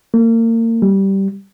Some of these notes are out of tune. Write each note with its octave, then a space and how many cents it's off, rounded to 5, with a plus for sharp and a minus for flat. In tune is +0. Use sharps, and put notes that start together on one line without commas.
A#3 -35
G3 -10